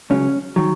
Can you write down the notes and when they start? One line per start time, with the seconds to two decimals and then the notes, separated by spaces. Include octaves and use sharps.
0.10 C#2 C#3 F#3 C#4
0.56 D#3 F#3